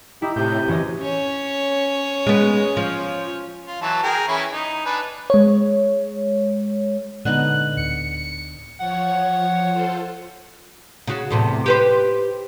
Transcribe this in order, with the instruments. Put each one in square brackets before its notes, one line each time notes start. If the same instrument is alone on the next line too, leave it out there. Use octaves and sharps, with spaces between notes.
[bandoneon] D#4 G4 [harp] E4
[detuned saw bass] A2 [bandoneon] C3 G6 [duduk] G4
[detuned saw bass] F#2 [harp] E3 C#4 D#5
[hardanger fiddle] C#4 C#5
[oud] G#3 B3
F3
[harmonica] F4
E3 F#3 A5
G#4 A#4 G5
E3 C#4 E4
D#4
D4 B4 G#5
[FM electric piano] G#3 C#5
[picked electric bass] A#2 G#3 [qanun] D3 B3 D#4 [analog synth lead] F#6
[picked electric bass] D1 [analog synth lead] C#7
[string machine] F3 C#5 [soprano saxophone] F#5
[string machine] F4 A4 C5
[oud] C#3 F#4
E2 A2 C3
G4 B4 C5